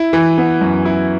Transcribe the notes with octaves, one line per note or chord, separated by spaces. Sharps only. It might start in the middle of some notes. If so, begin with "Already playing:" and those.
Already playing: E4
E3
B3
F#2
E4